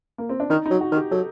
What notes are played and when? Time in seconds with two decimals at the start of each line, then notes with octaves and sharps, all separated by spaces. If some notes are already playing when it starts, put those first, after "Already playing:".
0.18 A#3
0.29 C4
0.40 D4
0.50 D#3 D#4
0.66 D#4
0.71 F#3
0.81 F#4
0.92 D#3
0.97 G4
1.11 F#3 A4